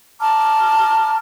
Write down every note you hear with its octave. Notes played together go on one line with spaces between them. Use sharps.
A5 A#5 D6 F6